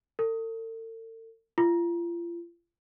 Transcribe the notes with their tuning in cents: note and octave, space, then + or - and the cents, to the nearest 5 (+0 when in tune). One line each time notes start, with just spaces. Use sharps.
A4 +45
F4 -35